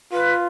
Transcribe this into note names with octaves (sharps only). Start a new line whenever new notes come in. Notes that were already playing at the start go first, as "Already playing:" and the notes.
F4 B4